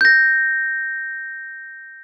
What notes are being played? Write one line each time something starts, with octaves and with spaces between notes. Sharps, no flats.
G6 A#6